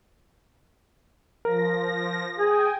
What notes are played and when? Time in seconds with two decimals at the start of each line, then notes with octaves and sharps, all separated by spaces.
1.45 F3 A#4 A#6
2.39 G#4 G5 G#5